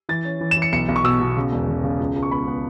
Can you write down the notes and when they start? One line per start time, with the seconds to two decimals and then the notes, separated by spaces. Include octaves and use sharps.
0.09 E3 A6
0.25 C#4
0.41 E3
0.51 E7
0.57 E3
0.62 C#7
0.72 B1 C#7
0.88 B1
0.96 C#6
1.04 B2 E6
1.20 B2
1.37 C#3
1.52 E1
1.68 C#3
1.84 C#3
2.00 C#2
2.16 C#2
2.23 C#6
2.31 B3 B5
2.48 B3